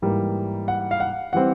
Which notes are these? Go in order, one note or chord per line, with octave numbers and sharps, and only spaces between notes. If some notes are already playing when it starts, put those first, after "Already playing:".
G#2 E3 G3 A#3
F#5
F5
F#5
E3 G3 C4 F#5